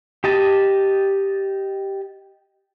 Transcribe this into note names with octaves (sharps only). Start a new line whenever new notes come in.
G4 D#5 A5